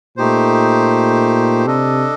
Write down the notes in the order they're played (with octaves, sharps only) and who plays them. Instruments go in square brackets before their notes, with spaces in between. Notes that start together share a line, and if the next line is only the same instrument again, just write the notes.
[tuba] A#2 [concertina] A3 D#4 G4 C5
[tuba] C3 [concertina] D4 A4 D#5